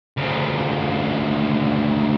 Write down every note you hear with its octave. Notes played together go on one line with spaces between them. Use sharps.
D2 C#3